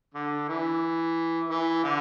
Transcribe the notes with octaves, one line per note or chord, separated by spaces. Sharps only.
D3
E3
E3
D3